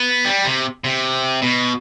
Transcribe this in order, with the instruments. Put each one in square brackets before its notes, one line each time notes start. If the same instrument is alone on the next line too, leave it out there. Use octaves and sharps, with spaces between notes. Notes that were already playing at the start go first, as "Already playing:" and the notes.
Already playing: [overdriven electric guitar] B3
G3
C3
C3
B2